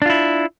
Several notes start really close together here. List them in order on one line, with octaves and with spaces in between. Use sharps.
D4 F4 E4